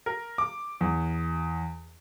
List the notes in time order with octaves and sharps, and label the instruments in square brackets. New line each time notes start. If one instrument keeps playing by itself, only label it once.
[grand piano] A#4
D6
E2